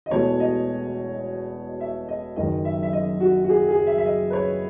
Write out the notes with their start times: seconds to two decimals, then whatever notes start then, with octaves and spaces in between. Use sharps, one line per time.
0.06 D#5
0.11 E1 E2 B2 A3 C#5
0.40 D#5
1.80 E5
2.09 D#5
2.36 F#1 F#2 D#3 D#5
2.65 E5
2.83 E5
2.93 D#5
3.21 F#4
3.44 F#4
3.49 G#4
3.69 G#4
3.87 E5
3.98 E5
4.06 D#5
4.30 B4
4.33 C#5